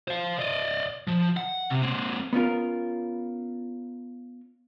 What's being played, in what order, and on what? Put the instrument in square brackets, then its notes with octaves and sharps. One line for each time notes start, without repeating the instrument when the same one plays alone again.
[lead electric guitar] C5 F5
D5 D#5
F3
F#5
C3
A#3 C4
[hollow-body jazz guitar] B3 C#4 F4 A#4